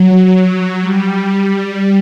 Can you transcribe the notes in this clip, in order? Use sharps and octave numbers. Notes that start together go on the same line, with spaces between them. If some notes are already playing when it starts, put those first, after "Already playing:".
Already playing: F#3
G3